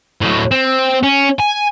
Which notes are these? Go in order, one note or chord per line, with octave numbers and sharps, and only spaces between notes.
A2 F#3
C4
C#4
G#5